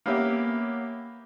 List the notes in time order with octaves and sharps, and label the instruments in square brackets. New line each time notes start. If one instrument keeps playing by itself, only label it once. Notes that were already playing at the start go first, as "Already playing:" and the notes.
[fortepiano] A#3 B3 C#4 G4 E5